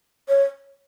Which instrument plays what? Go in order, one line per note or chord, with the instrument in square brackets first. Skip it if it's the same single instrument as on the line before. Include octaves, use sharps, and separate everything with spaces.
[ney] C#5